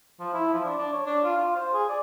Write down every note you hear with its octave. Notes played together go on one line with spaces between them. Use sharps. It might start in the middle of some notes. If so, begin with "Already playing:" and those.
F3
E4
F3
D4
D4
C#5
D4
F4
F4
C5
G#4
D5